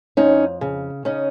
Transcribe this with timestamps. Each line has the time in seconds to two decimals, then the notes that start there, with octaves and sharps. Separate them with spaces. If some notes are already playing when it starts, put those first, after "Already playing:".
0.17 F2 C#4 D#4
0.61 C#3
1.05 C#3 C#4 D#4